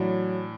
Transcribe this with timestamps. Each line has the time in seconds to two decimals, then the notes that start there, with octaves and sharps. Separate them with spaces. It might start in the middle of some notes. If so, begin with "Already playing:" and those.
Already playing: A2 E3 F#3 D4